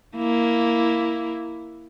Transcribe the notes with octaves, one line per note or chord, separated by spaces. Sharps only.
A#3 E4